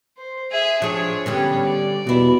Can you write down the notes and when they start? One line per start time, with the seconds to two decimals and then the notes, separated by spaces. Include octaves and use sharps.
0.17 C5
0.51 G#4 E5
0.82 F3 D4 G#4 C#5
1.26 D3 G3 B3 C#4 C#5
1.65 D5
2.07 E2 B2 E4